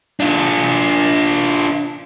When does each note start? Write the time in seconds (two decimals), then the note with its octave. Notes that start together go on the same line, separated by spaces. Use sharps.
0.20 D4 F4